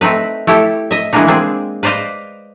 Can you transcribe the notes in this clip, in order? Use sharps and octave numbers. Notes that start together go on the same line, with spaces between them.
A3 C4 D#4 B4
A3 E4 G4 A4
D#5 E5
E3 G#3 A#3 B3 D4 D#4
G#3 A#3 C4 D4 G#4
B4 C5 D5 D#5 F5